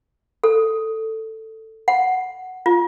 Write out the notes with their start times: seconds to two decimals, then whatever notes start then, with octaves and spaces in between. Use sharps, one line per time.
0.44 A4
1.88 F#5
2.66 F4